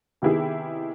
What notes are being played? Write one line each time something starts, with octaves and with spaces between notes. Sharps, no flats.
C3 D#3 B3 E4 G4 G#4